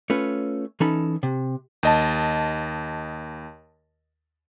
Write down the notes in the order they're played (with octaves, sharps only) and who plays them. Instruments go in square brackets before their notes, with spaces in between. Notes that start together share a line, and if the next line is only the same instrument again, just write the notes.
[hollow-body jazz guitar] A3 C#4 F4 B4
E3 C#4 D#4 A4 B5
C3
[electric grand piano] D#2 D#5 A5